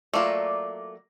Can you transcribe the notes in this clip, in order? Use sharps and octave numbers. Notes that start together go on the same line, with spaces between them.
F#3 A3 A#3 F4 D5